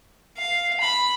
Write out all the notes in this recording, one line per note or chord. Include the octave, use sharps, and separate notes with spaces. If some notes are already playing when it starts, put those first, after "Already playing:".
F5
B5